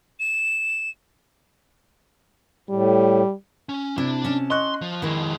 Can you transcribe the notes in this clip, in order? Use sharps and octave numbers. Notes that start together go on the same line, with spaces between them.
E7
A2 G3
C#4
C3 D4 E4
C#4 A5
D#5 C6 C#6 F#6
F3
F2 D#3 G#3 E4